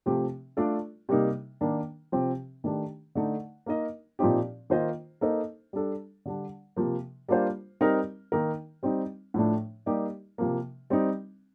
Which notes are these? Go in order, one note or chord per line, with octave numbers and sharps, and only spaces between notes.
C3 F3 A3 C4 G4
A3 D4 F4 A4 D5
C3 G3 A#3 D#4
D#3 A#3 D4
C3 F3 C4 G4
D#3 A3 D4 G4
D3 A3 D#4
A#3 D#4 A#4 D#5
A#2 F3 C4 D#4 G4
D#3 A#3 F4 C5 D#5
A#3 D#4 A4 C5 D#5
G3 D4 A4
D3 G3 D4
C3 F3 A#3
G3 A#3 D4 F4 C5
G3 C4 D#4 A#4
D#3 A#3 D#4 A#4
G3 C4 D#4
A2 F3 A3 D4
G3 A#3 D#4 G4 D5
C3 F3 A#3
G3 C4 D#4